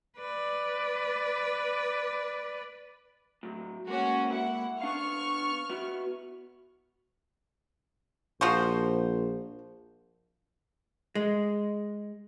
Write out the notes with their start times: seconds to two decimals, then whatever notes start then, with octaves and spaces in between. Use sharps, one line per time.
0.18 B4 D5
3.43 A2 F#3
3.87 G#3 A#3 C#4 F#4
4.30 E4 F#5
4.82 B3 D4 F5 C#6 F6
5.70 B3 E4 F#4
8.41 A#1 F3 F#4 C5
11.15 G#3